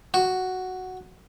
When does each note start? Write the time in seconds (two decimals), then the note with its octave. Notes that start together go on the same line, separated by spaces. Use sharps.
0.14 F#4